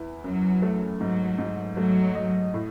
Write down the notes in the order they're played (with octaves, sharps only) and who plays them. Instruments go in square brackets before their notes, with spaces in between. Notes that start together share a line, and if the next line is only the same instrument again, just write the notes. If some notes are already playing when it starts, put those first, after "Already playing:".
Already playing: [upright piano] E2 E4
[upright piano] F#2 [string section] F#3
[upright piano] A3
[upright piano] G#2 [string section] F#3
[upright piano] G#2
[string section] F#3 [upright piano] A3
[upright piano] D#5
A2